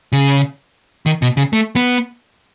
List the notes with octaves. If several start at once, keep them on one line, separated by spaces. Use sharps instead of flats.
C#3
D#3
B2
C#3
A3
B3